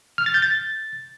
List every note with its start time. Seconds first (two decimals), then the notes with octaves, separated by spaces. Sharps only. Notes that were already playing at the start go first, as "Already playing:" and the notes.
0.18 F6
0.26 A6
0.34 G6
0.42 A6